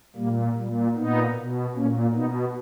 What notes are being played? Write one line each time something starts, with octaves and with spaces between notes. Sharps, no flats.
A#2 G3 A#3
A#2 G3
A#2 B3 D#4
B2
A#2 A#3 C#4
B2 B3 D#4